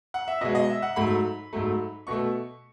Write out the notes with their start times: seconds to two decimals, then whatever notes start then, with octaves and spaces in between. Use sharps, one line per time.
0.14 F#5
0.28 E5
0.41 B2 G#3 D#5
0.55 D#5
0.70 E5
0.82 F#5
0.96 G#2 F#3 A3 B5
1.53 G#2 F#3 A3
2.07 B2 A3 C#6